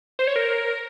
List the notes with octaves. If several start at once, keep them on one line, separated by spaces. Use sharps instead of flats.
C5
C#5
A#4